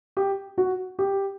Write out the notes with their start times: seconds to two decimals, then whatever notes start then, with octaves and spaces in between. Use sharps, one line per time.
0.17 G4
0.58 F#4
0.99 G4